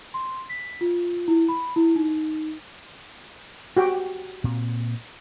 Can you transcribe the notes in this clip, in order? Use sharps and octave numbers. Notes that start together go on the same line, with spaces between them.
C6
B6
F4
E4
B5
E4
D#4
F#4 G4 G5
A#2 C4